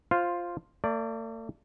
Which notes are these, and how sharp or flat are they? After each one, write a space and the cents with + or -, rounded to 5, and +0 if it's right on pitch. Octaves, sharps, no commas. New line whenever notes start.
F4 +0 C5 +10 F5 +0
A3 +45 D5 +0